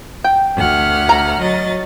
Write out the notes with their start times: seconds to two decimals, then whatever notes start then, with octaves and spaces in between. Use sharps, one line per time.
0.24 G5
0.57 D2 F#5 F6
1.09 A#5
1.40 F#3 D#5 A6